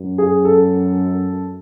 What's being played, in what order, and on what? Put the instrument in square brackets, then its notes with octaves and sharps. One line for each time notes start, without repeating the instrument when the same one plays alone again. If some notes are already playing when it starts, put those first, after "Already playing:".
Already playing: [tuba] F#2
[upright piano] G#4
A4